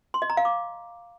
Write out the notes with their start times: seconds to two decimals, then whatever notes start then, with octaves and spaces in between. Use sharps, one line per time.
0.14 C6
0.22 D#5
0.30 A#5
0.37 F5
0.45 D6